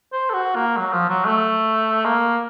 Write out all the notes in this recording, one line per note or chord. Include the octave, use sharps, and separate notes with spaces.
C5
A4
F#4
A#3
F#3
F3
F#3
A3
A#3